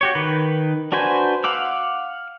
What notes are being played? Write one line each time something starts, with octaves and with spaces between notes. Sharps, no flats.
F#4 G4 C#5
D#3 B4
D4 F#4 B4 C5 G#5
F5 F#5 D6 E6